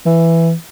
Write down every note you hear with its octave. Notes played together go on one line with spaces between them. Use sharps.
E3